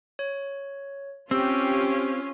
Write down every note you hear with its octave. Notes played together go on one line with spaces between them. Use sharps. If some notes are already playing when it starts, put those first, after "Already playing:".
C#5
C4 C#4 F4 G4 E6